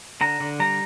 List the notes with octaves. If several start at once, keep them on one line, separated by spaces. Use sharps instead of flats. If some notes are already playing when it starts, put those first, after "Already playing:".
D3 A#5
D3
G3 A#5